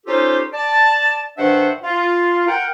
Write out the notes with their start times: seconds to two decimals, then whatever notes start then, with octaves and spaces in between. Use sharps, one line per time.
0.07 C#4 D#4 F4 G4 A4 C5
0.53 D5 A5
1.38 G2 D#3 D4 C5 E5 F#5
1.83 F4
2.48 A#4 F#5 G5